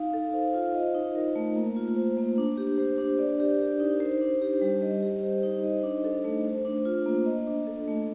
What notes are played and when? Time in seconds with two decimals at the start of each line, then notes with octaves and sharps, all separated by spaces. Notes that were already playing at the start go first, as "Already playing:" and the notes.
Already playing: D#4 F5
0.14 A4
0.33 C5
0.54 F4
0.74 D#5
0.95 D#4
1.15 A#4
1.35 A3
1.56 A#3
1.76 F4
1.96 C5
2.17 A#3
2.38 D4
2.57 G4
2.78 C5
2.98 D4
3.19 D5
3.40 G4
3.60 A#4
3.80 D#4
4.00 C5
4.21 D4
4.42 G4
4.61 G3
4.82 D#5
5.02 G4
5.23 C5
5.43 D#4
5.63 D#5
5.83 D4
6.05 A4
6.24 A3
6.45 C5
6.65 D4
6.85 F4
7.06 A#3
7.26 D#5
7.47 D4
7.67 A4
7.88 A3